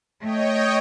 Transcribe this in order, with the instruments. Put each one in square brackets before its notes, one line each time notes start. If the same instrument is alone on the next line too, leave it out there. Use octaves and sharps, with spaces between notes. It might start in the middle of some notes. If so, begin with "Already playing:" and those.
[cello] A3 [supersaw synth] C#5 D#5 G5